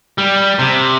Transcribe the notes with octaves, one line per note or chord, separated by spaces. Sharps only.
G3
C3